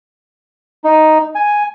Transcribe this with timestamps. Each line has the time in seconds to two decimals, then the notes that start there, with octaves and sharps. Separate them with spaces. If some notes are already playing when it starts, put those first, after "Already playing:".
0.84 D#4
1.35 G#5